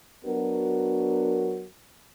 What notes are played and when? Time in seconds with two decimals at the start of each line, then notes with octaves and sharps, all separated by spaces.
0.25 F#3 B3 D4 F#4 A#4